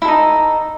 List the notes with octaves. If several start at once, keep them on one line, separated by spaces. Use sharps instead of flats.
D#4 E4 A4